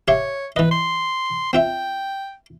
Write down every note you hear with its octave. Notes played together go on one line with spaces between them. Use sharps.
G4 C#5 E5 F5
E3 B4 D#5
C6
C4 F4 E5 G5